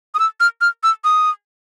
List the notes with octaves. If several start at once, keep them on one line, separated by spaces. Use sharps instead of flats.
D#6
E6
F6
F6
E6
D#6